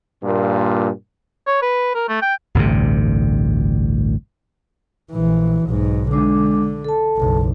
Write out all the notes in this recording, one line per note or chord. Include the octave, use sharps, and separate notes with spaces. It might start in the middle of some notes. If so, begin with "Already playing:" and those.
G2 A#2
C#5
B4
A#4
A3
G5
A1 D2 G2 C3
A#1 E3
B1 G#2
D3 G#3 D4 D6
A4 A5
F#1 B1